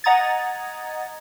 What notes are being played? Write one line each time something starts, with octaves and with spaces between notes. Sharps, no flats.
D#5 F#5 A#5 D#6 G#6 A6